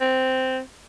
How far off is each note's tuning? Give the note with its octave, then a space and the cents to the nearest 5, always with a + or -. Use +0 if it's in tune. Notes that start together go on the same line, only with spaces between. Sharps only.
C4 -10